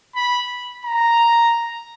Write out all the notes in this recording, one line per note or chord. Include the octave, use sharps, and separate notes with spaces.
B5
A#5